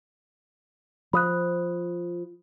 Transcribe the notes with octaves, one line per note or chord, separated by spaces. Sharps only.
F3 B5 D#6 F#6